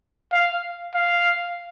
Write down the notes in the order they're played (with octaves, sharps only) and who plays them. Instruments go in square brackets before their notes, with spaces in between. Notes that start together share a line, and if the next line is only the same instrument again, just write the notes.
[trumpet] F5
F5